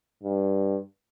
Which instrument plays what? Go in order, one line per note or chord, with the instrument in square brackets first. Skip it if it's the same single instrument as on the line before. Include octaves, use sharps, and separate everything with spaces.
[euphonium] G2